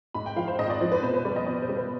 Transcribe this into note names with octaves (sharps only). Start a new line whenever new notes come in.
G#2 B5
G5
F3 F5
C5
G#2 D#5
D5
F3 C5
B4
B2 C5
B4
G3 D5
D#5
B2 D5
C5
G3
B4